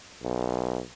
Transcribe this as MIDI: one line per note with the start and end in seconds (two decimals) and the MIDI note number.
0.23 0.81 35